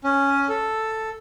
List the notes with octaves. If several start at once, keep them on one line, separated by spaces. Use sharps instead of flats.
C#4
A4